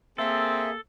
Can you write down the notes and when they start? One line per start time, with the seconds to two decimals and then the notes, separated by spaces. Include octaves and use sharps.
0.18 A#3 C4 G#4 A4 E5